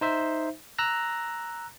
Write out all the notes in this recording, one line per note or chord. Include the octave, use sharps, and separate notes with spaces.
D#4 C5 E5
A#5 E6 F#6 A#6